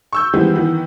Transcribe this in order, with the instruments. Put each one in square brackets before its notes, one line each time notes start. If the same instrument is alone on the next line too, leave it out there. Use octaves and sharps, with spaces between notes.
[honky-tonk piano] C#6 E6 G6
D#3 E3 G3 G#3 B3 C4
D#3 E3 B3